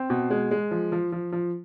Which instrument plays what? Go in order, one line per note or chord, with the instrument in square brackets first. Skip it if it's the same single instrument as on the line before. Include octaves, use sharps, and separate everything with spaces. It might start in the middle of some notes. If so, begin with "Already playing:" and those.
Already playing: [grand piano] C4
B2
G#3
G#3
F3
F3
F3
F3